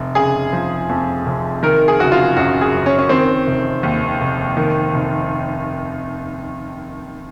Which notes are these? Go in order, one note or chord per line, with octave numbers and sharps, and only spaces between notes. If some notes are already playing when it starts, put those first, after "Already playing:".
Already playing: F1
C#3 G#4
F3
F2
F1
D#3 A#4
G#4
F#1 F#4
F4
F#2 F#4
G#4
F#1
C#4
C#4
D#3 C4
F1
D#2
F1
D#3
F1